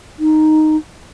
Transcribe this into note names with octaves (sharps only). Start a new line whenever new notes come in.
D#4